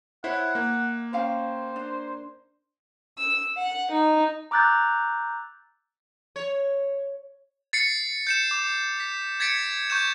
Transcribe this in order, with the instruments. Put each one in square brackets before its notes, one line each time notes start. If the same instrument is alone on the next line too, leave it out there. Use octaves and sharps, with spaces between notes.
[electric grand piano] E4 C5 C#5 [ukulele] E5 [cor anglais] F#5
[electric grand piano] A#3
[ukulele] C#4 F5 G5 [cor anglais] C5
[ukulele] D4
[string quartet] E6
F#5
D#4
[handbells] A#5 D6 E6 F#6 G6 A6
[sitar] C#5
[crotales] A6 C7 C#7
G6 C#7 E7
D6
B6
G#6 A6 B6 C#7 D7
C#6 G6 E7